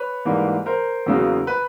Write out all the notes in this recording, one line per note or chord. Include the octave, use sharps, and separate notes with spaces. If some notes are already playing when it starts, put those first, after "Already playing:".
Already playing: B4 C#5
G#2 E3 G3 A#3
A#4 C5
E2 C#3 F#3 A#3
B4